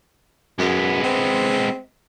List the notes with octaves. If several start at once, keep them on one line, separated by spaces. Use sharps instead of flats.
F#2 G#3 B3
C4